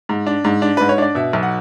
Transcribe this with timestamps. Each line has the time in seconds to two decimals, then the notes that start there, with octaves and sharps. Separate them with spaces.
0.09 G#2
0.27 D4
0.44 G#2
0.62 D4
0.77 G#2 B4
0.89 C#5
0.98 D4 D5
1.15 B2 E5
1.33 B1
1.43 F#5